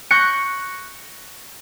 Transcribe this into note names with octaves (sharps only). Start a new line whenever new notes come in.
C#6 F#6 G6 A#6 C#7